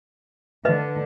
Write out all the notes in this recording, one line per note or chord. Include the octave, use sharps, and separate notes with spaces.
D3 B4 D#5